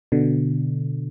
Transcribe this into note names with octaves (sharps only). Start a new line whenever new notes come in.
B2 D3